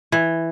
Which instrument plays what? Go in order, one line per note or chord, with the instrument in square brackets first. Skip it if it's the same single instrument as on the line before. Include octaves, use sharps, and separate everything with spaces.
[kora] E3